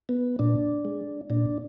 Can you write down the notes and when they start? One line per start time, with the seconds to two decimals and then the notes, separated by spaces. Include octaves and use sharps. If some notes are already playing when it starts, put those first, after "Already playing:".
0.09 B3
0.39 A#2 D4
0.85 G#3
1.30 A#2 D4